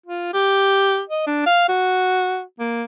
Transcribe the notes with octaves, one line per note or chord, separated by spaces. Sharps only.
F4
G4
D#5
D4
F5
F#4
A#3